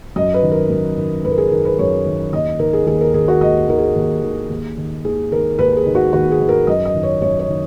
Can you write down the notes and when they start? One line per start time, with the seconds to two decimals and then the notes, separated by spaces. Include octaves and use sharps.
0.16 F#2 D#5
0.34 B4
0.43 D#3
0.52 A#4
0.70 F#2
0.97 D#3
1.25 F#2 B4
1.32 A#4
1.38 G#4
1.52 D#3 A#4
1.65 B4
1.79 F#2 C#5
2.06 D#3
2.33 D#2 D#5
2.59 D#3 A#4
2.73 G#4
2.87 D#2 G#4
3.01 A#4
3.14 D#3 G#4
3.28 F#4
3.41 D#2 D#5
3.69 D#3 A#4
3.78 G#4
3.96 D#2
4.23 D#3
4.50 D#2
4.77 D#3
5.05 D#2 G#4
5.32 D#3 A#4
5.59 D#2 B4
5.77 G#4
5.86 D#3
5.95 F#4
6.13 D#2 F#4
6.31 G#4
6.40 D#3
6.49 A#4
6.67 F#2 D#5
6.85 D#5
6.95 D#3
7.03 C#5
7.22 F#2 C#5
7.39 C#5
7.49 D#3